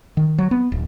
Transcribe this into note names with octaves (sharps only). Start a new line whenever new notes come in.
D#3
F#3
B3
D1